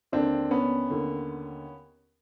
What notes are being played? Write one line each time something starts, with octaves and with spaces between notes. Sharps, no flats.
D#2 D3 C4 D4
B3 C#4
D#2 D3